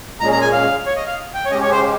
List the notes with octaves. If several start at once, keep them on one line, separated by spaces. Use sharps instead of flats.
A#2 G#3 C#4 G#4 A#5
A#5
G#5
F5
C#5
D#5
F5
G5
C#5
C#3 G#3 C#4 G4 D#5
C#5
C5